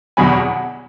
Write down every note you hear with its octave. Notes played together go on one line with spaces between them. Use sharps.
E2 B2 F#3 G#5 B5